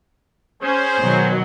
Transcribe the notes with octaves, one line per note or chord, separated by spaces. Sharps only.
C#4 G#4 C5
B2 D#3 F#3